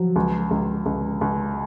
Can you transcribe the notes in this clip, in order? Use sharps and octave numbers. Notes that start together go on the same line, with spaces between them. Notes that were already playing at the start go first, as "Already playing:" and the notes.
Already playing: F3 F#3
C#2
C#2
C#2
C#2